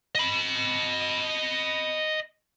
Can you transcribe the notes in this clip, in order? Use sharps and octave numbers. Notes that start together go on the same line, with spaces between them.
D#5 B5